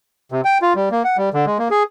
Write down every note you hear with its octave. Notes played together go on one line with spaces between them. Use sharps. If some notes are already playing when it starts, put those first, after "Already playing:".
C3
G5
F4
G3
A#3
F#5
G3
D3
G#3
A#3
G#4